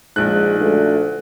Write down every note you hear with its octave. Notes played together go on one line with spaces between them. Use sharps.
A#1 G#2 F#6
D2